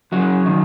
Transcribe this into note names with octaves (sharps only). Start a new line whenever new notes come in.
F#2 C#3 F#3
D#3